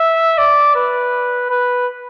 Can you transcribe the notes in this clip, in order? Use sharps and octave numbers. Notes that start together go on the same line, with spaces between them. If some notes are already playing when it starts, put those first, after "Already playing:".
Already playing: E5
D5
B4
B4